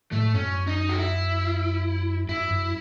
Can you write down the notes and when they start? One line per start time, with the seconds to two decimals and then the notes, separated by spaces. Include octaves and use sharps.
0.12 A2 A3
0.34 F#2 C#4
0.67 D#4
0.89 F#4
0.99 E4
2.29 F#2 E4
2.51 F#2